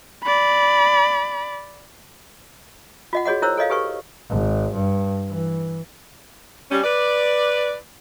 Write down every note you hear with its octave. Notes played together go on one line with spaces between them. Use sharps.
D5 B5
F4 D#5 F#5
F#4 G#4 C#5 D#5 F#5
E4 A#4 C5 C#5 E6
A4 C#5 D#5 F5
G4 A4 B4 C#6
G#1
G2
E3
G3 C#4
B4 D5